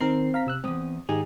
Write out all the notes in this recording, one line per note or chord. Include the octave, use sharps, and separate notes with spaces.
D#3 C4 A#4 C7
F5 A#5 B6
C3 E6 F#6
E2 G2 C4 D#6
G#2 D#3 D#4 G4 G#4